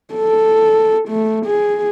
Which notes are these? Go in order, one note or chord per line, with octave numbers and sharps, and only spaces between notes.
A4
A3
G#4